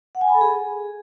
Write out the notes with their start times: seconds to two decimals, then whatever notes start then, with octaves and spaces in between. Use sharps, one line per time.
0.15 F#5
0.21 G#5
0.28 B5
0.34 A4
0.41 G#4